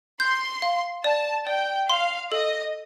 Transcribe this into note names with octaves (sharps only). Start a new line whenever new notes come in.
C6 G6
F5
D5 A5
D5 G5
F5 C6
A4 D#5